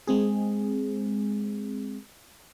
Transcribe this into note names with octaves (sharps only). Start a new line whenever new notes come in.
G#3 C4 G#4